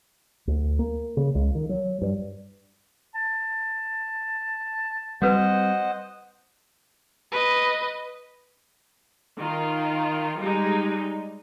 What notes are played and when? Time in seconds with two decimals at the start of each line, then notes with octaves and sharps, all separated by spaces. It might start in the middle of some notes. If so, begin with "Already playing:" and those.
0.47 D2
0.79 A#3
1.17 C#3
1.35 C#2
1.55 D#3
1.69 F#3
2.02 G2
3.15 A5
5.22 G3 C4 F#4 B4 C5 D#5 F#5
7.32 B4 D#5
9.37 D#3 F4
10.37 G3 G#3 D#4